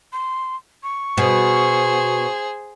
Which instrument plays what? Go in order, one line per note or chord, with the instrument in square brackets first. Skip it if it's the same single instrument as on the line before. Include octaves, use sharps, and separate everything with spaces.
[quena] C6
C#6
[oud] B2 [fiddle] G#4 C5